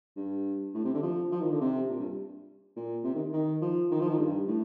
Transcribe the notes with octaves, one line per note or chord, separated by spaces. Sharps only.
G2
A2
C3
D3
F3
F3
D#3
D3
C3
A#2
G2
A#2
C3
D#3
D#3
F3
D#3
F3
D#3
G2
A2